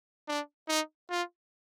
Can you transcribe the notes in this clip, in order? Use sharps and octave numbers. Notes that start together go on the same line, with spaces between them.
D4
D#4
F4